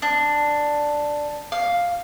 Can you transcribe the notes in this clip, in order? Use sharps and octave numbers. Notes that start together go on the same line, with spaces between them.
D4
F5